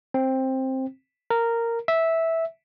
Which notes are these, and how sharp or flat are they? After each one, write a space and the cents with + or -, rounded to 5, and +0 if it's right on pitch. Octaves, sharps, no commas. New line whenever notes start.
C4 +10
A#4 -10
E5 -10